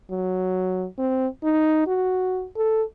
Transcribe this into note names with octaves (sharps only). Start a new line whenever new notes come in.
F#3
C4
D#4
F#4
A4